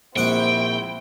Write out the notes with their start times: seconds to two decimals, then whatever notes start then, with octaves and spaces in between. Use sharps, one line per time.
0.16 A#1 C4 E4 F#5 G5 C#6